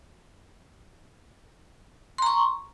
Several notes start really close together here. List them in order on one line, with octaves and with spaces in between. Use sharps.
C6 A#5 C#6